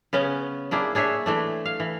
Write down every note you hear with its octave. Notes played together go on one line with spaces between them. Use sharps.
C#3 B3 C#4
A#3 D4 E4 G#4
D4 G#4 C#5 E5
E3 A3 D4
F5
E3